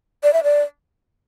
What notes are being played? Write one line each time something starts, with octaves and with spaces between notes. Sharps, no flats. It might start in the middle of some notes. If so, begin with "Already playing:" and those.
D5
E5
D5